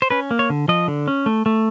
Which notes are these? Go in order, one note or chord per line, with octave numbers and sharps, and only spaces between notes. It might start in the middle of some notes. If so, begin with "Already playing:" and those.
C5
C#4 B4
A#3
C#5
D3
F3 D#5
D3
C#4
A3
A3